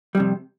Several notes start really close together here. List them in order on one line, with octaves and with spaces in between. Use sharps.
G3 F2 C3